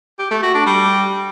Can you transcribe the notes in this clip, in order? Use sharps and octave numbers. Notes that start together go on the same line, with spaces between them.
G4
A3
F#4
D4
G3